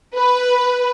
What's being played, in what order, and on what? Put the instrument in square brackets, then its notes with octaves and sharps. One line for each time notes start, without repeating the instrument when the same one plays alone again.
[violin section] B4